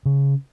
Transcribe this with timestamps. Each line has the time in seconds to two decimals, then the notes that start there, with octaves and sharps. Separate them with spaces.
0.05 C#3